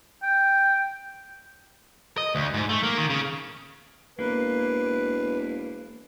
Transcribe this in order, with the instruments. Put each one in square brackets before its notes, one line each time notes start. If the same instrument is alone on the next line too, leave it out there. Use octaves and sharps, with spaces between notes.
[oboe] G5
[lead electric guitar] D#5
D2
G#2
A3
A#3
D#3
C#3
[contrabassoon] E1 [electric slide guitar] A#3 [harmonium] B4